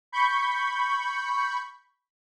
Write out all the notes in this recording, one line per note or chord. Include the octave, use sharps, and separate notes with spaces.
B5 C#6 G6